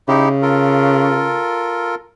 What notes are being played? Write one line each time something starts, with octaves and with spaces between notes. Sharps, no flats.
C#3 D#4 E4 G4
F4 A4 A#4